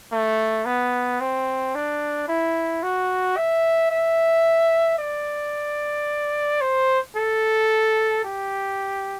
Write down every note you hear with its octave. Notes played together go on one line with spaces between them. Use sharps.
A3
B3
C4
D4
E4
F#4
E5
E5
D5
C5
A4
G4